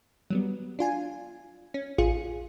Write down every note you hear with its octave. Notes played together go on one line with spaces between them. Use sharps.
F#3 G3 B3
D4 F4 G#5
C#4
A1 F4 G#4 C#7